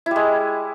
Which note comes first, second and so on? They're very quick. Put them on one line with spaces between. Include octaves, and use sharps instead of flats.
E4 G3 G#3